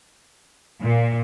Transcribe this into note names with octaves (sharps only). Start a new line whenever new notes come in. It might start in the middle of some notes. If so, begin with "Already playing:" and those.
A#2